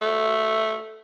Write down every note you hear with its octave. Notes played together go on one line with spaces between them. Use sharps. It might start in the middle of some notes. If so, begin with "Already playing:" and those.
A3